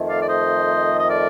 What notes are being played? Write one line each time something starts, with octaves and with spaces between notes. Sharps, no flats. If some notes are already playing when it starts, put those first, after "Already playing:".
Already playing: F2 D#3 A3
D5 F5
D5
C5 D#5
D#5
A#4 D5